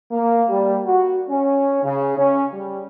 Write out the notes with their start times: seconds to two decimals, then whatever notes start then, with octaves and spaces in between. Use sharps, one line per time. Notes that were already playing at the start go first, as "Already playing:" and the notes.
0.12 A#3
0.49 G3
0.85 F#4
1.29 C#4
1.84 C#3
2.17 C#4
2.52 G3